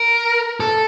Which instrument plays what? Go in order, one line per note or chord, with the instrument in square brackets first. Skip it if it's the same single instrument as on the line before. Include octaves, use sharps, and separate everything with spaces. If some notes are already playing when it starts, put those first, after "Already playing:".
Already playing: [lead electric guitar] A#4
A4